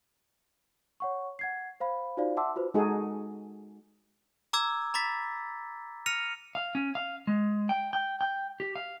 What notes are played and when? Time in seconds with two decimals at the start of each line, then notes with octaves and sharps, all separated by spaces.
1.00 C#5 F#5 C#6
1.39 F#5 G#6 C7
1.80 C5 F5 B5
2.17 D#4 F4 F#4 C5 D5 F5
2.37 E5 F#5 A5 C6 D6 E6
2.56 F4 F#4 B4 C5
2.74 G#3 D#4 F#4 G#4 A4
4.53 A#5 D6 E6 G#6
4.94 A#5 B5 D6 A6 B6
6.06 F6 A#6 C#7 D#7 F7
6.55 F5
6.75 C#4
6.95 F5
7.27 G#3
7.69 G5
7.93 G5
8.21 G5
8.60 G4
8.76 F5